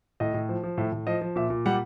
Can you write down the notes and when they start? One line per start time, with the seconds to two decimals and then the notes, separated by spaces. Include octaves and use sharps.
0.20 A2 D#5
0.34 A2
0.49 F3
0.63 F3
0.78 A2 E5
0.92 A2
1.07 F3 D#5
1.21 F3
1.36 A#2 E5
1.50 A#2
1.66 G3 F#5